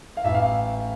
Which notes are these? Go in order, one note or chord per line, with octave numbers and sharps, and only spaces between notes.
F5
A1 E5
F5